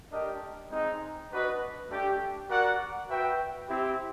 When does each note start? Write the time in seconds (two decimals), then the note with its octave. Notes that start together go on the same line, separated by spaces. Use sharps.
0.10 A3 D4 G4 A#4 D#5
0.70 G#3 C4 D#4
1.30 D4 F#4 B4 D#5
1.89 A3 D4 G4
2.49 F#4 A#4 D5 F#5
3.09 F#4 B4 E5 G5
3.69 C4 E4 G4